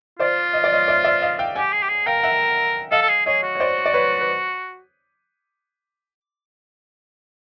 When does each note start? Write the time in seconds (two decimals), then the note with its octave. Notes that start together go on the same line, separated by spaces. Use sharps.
0.19 F4 C5 D5
0.54 D#5
0.64 D5
0.73 C#5 D#5
0.88 D5 E5
1.04 D5 E5
1.22 D#5 F5
1.39 F5 G5
1.55 G4 F#5 G#5
1.73 G#4
1.82 G4
1.89 G#4
2.06 A#4 F5 G5
2.23 E5 F#5
2.91 A4 D#5 F5
3.02 A4
3.09 G#4
3.26 G#4 C#5 D#5
3.43 F#4
3.55 C#5
3.60 C5 D5
3.86 D5
3.94 B4 C#5
4.21 B4